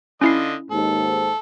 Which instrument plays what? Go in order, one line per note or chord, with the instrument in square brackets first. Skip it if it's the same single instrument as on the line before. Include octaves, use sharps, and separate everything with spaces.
[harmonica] D3 F4 D#5 [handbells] C#4 E4 C7
[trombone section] D#2 G#2 [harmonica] A4